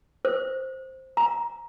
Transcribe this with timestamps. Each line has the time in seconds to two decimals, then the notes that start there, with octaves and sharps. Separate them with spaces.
0.25 C5
1.17 A#5